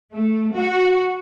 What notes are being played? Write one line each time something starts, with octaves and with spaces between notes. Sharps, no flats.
A3
F#4